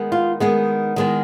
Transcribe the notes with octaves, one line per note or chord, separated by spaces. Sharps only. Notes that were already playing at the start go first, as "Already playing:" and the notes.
Already playing: D#3 G#3 B3
F4
D#3 G#3 B3
D#3 G#3 B3